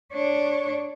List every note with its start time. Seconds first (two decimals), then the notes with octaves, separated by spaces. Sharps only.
0.13 D4 C#5